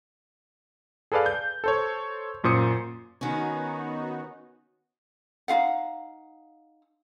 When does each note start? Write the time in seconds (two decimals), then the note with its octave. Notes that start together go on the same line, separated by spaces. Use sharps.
1.12 G#4 A4 B4 D5 F5
1.26 G6
1.64 A4 C5 C#5
2.44 F#2 A#2 C5 D#6 C#7
3.21 D#3 B3 C#4 D#4 F#4
5.48 D#4 F4 F5 F#5